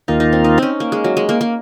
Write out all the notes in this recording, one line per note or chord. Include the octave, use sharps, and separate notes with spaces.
D#2 D#3 A#3 D#4 F4
D#4
C4
D#4
C4 C#4
A#3
G#3
F#3
G#3
A#3
A#3